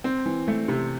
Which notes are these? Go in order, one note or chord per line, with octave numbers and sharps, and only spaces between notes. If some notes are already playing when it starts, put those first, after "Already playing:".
C4
E3
A3
C3